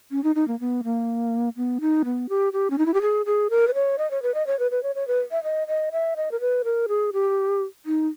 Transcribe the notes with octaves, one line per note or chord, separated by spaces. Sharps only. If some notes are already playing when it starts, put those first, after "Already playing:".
C#4
D#4
D#4
A#3
B3
A#3
B3
D#4
B3
G4
G4
C#4
D#4
E4
G4
G#4
G#4
A#4
B4
C#5
D#5
C#5
B4
D#5
C#5
B4
B4
C#5
C#5
B4
E5
D#5
D#5
E5
D#5
A#4
B4
A#4
G#4
G4
D#4